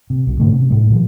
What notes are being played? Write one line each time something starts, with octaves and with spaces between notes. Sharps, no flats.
C3
B1
G#2 B2 D3 A3
C3 C#4
A2 G#3
A#2 D#3 F3